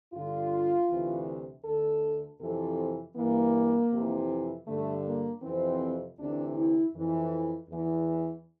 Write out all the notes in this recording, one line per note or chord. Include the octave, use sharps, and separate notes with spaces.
G2 D3 F4
D2 C3 E3
D2 D3 A4
F2 C3 E3 A4
G2 E3 A#3
F2 C3 E3
G2 D3 A3
A#3
F2 C3 E3 C4
D2 C3 E3 D4
E4
F2 E3
E2 E3